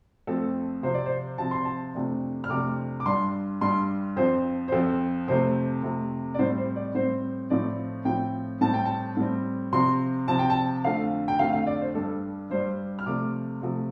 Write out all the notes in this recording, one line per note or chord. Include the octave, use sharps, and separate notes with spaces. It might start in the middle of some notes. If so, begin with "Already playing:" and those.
F2 F3 A3 C4 A4
C3 F3 C4 C5
D5
C5
C3 F3 C4 A5
C6
A5
F2 C3 A3 D4
F6
F2 C3 A3 D4 D6
D6
G2 G3 D4 C6
G2 G3 D4 C6
F2 F3 C4 C5
C5
F2 F3 C4 A4
F2 C3 A3 C5
F2 C3 A3
D5
A2 G3 C4 C5
C5
D5
A2 G3 C4 C5
A2 F3 C4 D5
A2 F3 C4 G5
A2 G3 C4 A5
G5
A5
A2 G3 C4
C3 F3 C4 C6
C3 F3 C4 A5
G5
A5
F2 D3 A3 F5
G5
F2 D3 A3 F5
F5
D5
C5
G2 G3 D4 A4
G2 G3 D4 C5
F6
C3 F3 A3 D6
C3 F3 A3